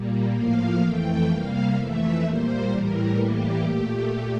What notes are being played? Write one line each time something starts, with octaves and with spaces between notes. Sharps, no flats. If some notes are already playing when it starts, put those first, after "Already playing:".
Already playing: A#2 G3 A#3
A2 F3 A#3 F5
F2 E3 A3 G5
C3 G3 A#3 F5
F2 E3 A3 E5
A#2 G3 A#3 C5
A2 E3 G3 A#4
A2 E3 G3 A#3 G4
A#2 A3